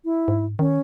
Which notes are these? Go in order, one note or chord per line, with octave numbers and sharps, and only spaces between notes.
E4
G#2
D#3 C#4